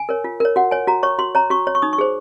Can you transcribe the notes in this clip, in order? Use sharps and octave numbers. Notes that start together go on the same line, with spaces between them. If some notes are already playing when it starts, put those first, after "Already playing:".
Already playing: G#5
A#4 C#5
F4
A#4 C#5
F#4 F#5
C#5 G#5
F#4 A#5
C#5 C#6
F#4 C6
C#5 A#5
F#4 C#6
C#5
C#6
D#4 D#6
C#6
G#4 C5